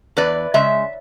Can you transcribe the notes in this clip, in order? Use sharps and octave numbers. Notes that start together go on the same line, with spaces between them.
E2 B4 D5
C#3 G#3 E5